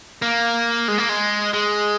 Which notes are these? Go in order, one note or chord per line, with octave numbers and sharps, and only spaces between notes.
A#3
G#3
A#3
G#3
G#3